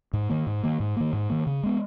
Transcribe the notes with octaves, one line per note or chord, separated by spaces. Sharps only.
G#2
D#3 A#3
G#2
D#3 A#3
G#2
D#3 A#3
G#2
D#3 A#3
C#3
G#3 B3